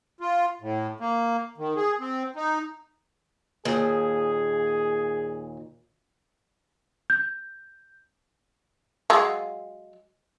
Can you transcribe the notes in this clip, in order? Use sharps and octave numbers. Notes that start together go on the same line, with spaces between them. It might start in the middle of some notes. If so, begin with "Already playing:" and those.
F4
A2
A#3
D#3
G#4
C4
D#4
D#2 A#2 G#4
G6
F#3 G#3 F4